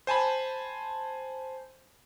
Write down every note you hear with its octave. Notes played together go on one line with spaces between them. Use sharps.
C5 G#5 A5 B5